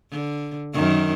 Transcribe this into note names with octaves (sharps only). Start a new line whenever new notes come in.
D3
F#2 D#3